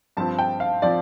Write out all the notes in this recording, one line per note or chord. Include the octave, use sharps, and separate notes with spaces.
G2 F3 C4 A5
G5
F5
F3 C4 D5